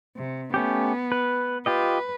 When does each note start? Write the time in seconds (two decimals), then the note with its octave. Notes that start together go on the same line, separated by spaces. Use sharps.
0.17 C3
0.54 A3 B3 C#4 G4
1.12 B4
1.66 F4 G4 B4 D#5